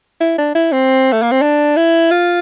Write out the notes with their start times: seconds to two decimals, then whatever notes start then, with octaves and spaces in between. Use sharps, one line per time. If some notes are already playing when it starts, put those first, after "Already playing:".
0.21 E4
0.38 D4
0.55 E4
0.72 C4
1.13 A3
1.22 A#3
1.32 C4
1.42 D4
1.76 E4
2.11 F4